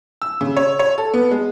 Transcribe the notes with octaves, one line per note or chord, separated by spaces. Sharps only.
E6
C#3
C#5
C#5
A4
B3
G#3